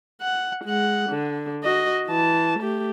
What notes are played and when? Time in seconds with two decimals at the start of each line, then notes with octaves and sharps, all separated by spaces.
0.22 F#5
0.65 G#3 F#5
1.10 D3
1.64 F#4 D#5
2.08 E3 A5
2.60 A3 G4